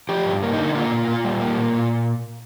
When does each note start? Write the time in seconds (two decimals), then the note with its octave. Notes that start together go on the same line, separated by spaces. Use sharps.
0.09 F3 G4
0.26 G2
0.43 A#3
0.53 D#4
0.58 D3
0.75 A#3 F4
0.92 A#2
1.08 A#2
1.25 G3
1.41 A#3
1.57 A#2
1.73 A#2